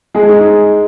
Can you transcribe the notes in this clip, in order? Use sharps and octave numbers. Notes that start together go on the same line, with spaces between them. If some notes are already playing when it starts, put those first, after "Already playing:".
G#3 G#4
D#4